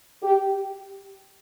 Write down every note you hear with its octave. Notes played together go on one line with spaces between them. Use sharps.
G4